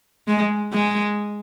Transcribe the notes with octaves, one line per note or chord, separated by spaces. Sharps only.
G#3
G#3